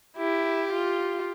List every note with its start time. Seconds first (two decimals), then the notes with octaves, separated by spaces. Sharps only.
0.17 E4 G4
0.72 F4